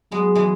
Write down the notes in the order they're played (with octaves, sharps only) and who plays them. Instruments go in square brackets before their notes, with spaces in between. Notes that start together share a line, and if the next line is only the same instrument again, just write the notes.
[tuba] F#3 [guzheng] G#3 B3
[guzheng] E3 G#3